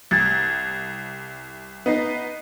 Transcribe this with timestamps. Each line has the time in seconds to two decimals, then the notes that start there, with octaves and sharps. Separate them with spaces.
0.11 C2 G#6 A6
1.86 B3 D#4 C7